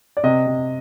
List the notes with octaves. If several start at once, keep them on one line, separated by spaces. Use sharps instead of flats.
D5
C3 D#5
C3